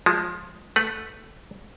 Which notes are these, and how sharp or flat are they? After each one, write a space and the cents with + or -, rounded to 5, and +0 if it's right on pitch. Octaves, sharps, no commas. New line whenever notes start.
F3 +15 G#3 +0
A3 +0 B4 -5 F#5 +0